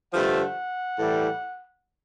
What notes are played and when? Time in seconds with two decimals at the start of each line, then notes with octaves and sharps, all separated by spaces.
0.13 G2 D3 F3 A3 F#5
0.97 A2 E3 G3